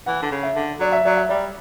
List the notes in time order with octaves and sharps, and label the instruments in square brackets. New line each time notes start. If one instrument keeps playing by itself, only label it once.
[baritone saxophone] E3 [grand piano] F#5
[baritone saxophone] D3
C#3
[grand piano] E5
[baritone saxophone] D3
[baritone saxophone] F#3 [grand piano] D5
[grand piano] E5
[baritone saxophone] F#3 [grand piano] D5
[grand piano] E5
[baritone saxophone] G3 [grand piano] D5